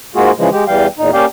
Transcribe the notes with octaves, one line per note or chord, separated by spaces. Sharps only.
G#2 G#3 A#3 F4 F#4 G#4
C#3 E3 F3 G#3
G#3 G4
E2 E3 G3 F5 G5
E2 A#2 D#4
A#3 C#4 G4 D5 F5 G5